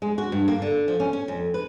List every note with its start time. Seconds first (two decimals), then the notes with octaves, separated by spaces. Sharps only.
0.02 G#3
0.18 F#4
0.32 G2
0.48 A#3
0.62 D3
0.88 F3
1.00 C#4
1.13 C#4
1.28 F2
1.54 B4